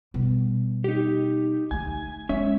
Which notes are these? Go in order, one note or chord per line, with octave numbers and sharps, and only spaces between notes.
B2 G3
D#4 G4
D2 A3 G#5
G#3 C#4 D#4 E5